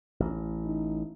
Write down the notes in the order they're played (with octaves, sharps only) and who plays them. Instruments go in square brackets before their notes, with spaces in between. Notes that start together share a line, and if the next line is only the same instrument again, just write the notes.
[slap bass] A1
[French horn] D#4